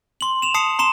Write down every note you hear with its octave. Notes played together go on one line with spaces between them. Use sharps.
C6 F#7
E7 F7
A5 D#6 C7 C#7
A#5 C6 E7